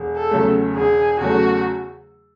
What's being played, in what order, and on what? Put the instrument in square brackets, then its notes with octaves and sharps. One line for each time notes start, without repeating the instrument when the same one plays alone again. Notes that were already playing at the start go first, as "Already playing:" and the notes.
Already playing: [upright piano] E1
[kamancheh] A4
[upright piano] E2 C#3 F#3 A3
[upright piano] E1 [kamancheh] G#4
[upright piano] E2 C#3 F#3 A3 [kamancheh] F#4